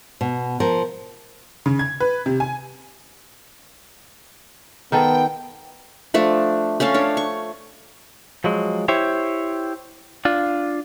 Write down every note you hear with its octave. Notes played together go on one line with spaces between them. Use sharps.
B2
F3 A#4
C#3
G#6
B4
C3
G#5
D#3 B3 D#4 A4 G5
F3 A3 D4
A3 C#4 A4 F5
D4 C#5
C#6
F3 F#3 G#3
E4 G4 C5 C#5
D4 F4